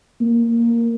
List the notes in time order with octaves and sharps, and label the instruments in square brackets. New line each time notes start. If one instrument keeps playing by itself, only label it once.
[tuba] A#3